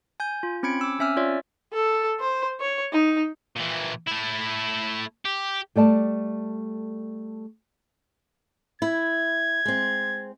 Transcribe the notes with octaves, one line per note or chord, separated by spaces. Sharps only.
G#5 G6
F4
C4 C#4 B5 G#6 C#7 D7
D6 E6
C4 C#4 E5 G#5 E6 F6
F4 C#5 D5 E5
A4
C5
C#5
D#4
A#2 E3
A3 E4
G4
G3 A3 D5 A5
E4 G#6
G#3 C4